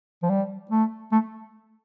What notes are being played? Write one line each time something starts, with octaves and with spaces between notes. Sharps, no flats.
F3
G3
A3
A3